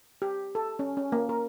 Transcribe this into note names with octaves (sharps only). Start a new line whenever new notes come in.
G4
A4
C#4
C#4
A#3
A#4